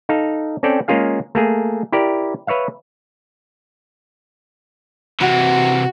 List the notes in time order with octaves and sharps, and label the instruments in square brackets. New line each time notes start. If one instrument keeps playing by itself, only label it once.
[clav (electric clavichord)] D#4 A4 F5 A#5
C4 C#4 A4 D5 G5
G#3 A#3 C#4 F4 G#4 F5
A3 A#3 G#4
E4 G4 A#4 D5
B4 C#5 E5 F5
[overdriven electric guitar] C3 E3 [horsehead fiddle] F#4